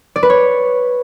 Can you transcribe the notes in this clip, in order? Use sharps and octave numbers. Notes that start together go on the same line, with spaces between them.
D5
B4
C#5